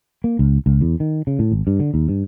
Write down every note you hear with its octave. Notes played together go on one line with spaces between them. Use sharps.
A#3
C#2
C#2
E2
D#3
C#3
A2
G#1
G2
D3
D#2
G2